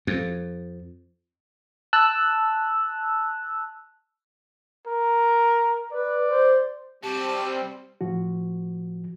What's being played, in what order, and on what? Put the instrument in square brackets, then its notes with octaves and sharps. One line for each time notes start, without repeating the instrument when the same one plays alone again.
[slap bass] F2
[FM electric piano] A5 E6 F#6
[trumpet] A#4
[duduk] B4 [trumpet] D5
[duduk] C5
[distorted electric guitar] C3 F#4 [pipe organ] G3 C4 [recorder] G4 [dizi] A5
[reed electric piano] A2 F3 F#4